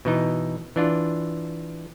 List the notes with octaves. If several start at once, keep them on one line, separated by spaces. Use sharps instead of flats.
B2 E3 D#4
E3 D4 F4